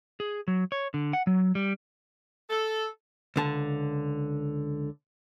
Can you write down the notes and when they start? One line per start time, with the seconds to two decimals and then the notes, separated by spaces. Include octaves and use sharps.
0.20 G#4
0.48 F#3
0.72 C#5
0.94 D3
1.13 F#5
1.27 F#3
1.55 G3
2.50 A4
3.36 C#2 D3 A5